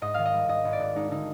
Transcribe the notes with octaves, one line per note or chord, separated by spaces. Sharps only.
G#2 D#5
D#3 F5
D#5
G3
G#2 D#5
G#1
D5
G#2
G#3 D#4
D3 D#4